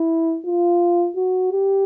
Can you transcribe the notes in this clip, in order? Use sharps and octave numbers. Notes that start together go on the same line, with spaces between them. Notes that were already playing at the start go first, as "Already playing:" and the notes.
Already playing: E4
F4
F#4
G4